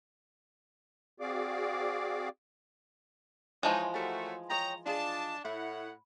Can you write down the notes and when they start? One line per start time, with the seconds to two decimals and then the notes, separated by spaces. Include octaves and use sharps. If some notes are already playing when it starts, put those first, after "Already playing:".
1.20 C4 F#4 G#4 D5 F5 D6
3.63 E3 F3 G#3 D#4 C#5
3.94 A3 F#4 G4 A#4 C#5
4.50 C#5 D#5 G5 A#5
4.86 D4 F4 G#4 D#5 A5
5.45 A2 E4 F#5